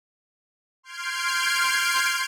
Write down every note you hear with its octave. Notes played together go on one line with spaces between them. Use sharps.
C6 F6 G6 G#6 C7 D7